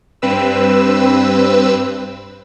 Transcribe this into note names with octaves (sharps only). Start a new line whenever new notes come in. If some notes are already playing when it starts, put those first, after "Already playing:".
G2 C4 B4 E6